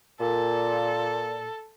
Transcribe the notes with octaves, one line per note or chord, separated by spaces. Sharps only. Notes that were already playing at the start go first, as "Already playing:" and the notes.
A#2 A4